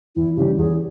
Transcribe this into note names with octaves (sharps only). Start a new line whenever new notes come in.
E2 E4
C#3 E3 G3 C#4 G4
E2 G#4